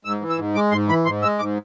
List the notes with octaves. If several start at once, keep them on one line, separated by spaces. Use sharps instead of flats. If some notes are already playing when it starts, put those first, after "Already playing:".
G#2 E6
E3
E6
G#2
G#3 D6
G#2 C6
E3 B5
G#2 C6
G#3 E6
G#2 D6